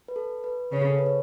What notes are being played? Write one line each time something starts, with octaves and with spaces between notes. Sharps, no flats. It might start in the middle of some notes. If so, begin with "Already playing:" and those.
B4
A4
B4
C#3 C#5
G#4
A4
B4
C#5